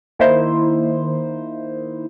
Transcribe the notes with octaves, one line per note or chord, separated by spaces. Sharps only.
D#3 A#3 D#4 E4 C5